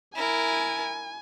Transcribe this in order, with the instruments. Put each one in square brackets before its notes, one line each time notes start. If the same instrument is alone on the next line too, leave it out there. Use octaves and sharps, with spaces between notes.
[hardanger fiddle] E4 A#4 [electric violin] G#5